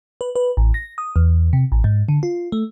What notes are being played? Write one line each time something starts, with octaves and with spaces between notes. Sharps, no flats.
B4
B4
A1
A#6
D#6
E2
C3
A1
G#2
D3
F4
A3